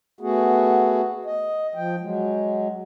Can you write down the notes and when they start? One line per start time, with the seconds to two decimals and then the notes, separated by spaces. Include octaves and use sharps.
0.21 A3 B3 F#4 G#4
1.25 D#5
1.75 F3 G5
2.00 F#3 G#3